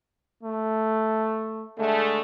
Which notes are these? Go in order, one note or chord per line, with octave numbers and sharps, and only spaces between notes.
A3
D3 G#3 A3